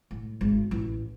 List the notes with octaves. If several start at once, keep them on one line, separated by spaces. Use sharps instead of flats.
A2
G#1
A1